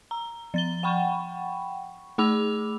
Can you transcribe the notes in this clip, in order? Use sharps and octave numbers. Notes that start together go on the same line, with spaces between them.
A#5
F3 A6 G7
F#5 G5 B5 C#6
A3 G#4 B5 D6 E6 F7